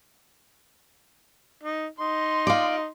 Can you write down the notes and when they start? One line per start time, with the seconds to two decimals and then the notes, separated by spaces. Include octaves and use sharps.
1.63 D#4
1.99 D#4 C6
2.47 F4 D5